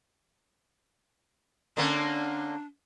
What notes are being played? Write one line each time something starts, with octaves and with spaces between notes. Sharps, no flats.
D3 A#3 C#4 D4